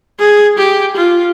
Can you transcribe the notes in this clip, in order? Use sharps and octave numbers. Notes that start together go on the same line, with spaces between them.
G#4
G4
F4